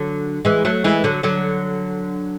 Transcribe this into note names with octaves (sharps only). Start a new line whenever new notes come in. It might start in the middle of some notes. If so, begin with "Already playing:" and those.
Already playing: D3 F#3
E3 G#3
F#3 A3
E3 G#3
D3 F#3
D3 F#3